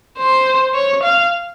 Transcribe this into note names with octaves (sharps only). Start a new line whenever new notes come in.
C5
C#5
F5